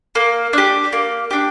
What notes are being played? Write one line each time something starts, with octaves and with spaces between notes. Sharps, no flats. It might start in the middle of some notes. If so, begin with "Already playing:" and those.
A#3
D4 G4
A#3
D4 G4